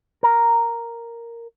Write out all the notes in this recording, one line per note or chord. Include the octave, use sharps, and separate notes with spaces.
A#4